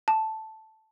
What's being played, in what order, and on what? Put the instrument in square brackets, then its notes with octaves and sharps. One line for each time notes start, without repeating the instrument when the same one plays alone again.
[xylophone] A5